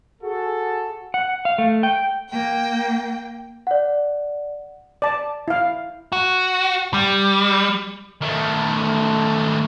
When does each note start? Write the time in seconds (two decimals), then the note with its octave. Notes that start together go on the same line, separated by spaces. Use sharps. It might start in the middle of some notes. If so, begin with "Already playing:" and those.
0.22 F#4 G#4 A4
1.14 F#5
1.45 F5
1.58 A3
1.83 G5
2.29 A#3 G5
3.67 D5 F#5
5.02 D5 A5
5.48 E4 F5
6.12 F#4
6.94 G3
8.21 D#3 A3